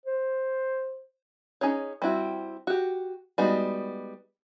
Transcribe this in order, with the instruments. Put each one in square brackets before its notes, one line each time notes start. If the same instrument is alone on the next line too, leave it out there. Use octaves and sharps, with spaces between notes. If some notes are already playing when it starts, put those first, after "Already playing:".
[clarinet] C5
[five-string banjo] C#4 D#4 G#4 C#5
G3 C4 E4 F#4
F#4 G4
G3 G#3 B3 D#4 F#4